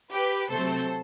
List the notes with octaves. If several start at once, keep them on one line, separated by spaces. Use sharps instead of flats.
G4 B4
C3 F#3 A3 C4 A4 C5